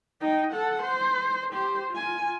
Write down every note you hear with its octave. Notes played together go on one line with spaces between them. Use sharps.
D#4 G5
A4 F#5
C5
G4 C5
F4 G#5